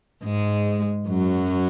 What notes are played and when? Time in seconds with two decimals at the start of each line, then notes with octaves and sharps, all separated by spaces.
0.23 G#2 G#3
1.08 F#2 F#3